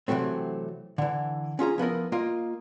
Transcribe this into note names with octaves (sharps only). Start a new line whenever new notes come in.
C3 E3 F#3 A3 C4
D3 E3
C#4 F4 G#4 A#5
F3 B3 E4 A#4
A#3 F4 D#5